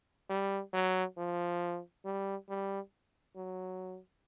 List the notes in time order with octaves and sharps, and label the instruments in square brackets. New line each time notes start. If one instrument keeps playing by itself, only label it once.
[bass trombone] G3
F#3
F3
G3
G3
F#3